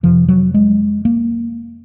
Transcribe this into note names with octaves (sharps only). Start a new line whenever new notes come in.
F2 C3 F3
F#3
G#3
A#3